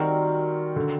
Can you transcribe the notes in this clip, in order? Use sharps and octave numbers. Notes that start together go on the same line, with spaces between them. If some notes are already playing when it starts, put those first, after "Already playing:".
Already playing: D#3 G3 C4 F#4 A#4
D3